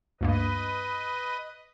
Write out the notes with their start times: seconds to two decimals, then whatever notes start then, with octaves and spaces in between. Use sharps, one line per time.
0.21 D2 G2 A#3 B4 D#5